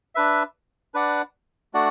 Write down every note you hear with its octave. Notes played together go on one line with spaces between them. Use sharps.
D4 B4 E5
D4 B4 D5 F#5
A3 D4 F#4 D5 F#5